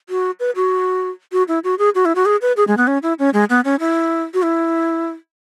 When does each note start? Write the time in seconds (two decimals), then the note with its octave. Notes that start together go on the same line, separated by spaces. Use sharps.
0.09 F#4
0.40 B4
0.56 F#4
1.32 F#4
1.48 E4
1.64 F#4
1.79 G#4
1.95 F#4
2.05 E4
2.15 F#4
2.26 G#4
2.42 B4
2.57 G#4
2.67 G#3
2.77 B3
2.87 C#4
3.03 E4
3.19 C#4
3.33 G#3
3.50 B3
3.65 C#4
3.80 E4
4.34 F#4
4.43 E4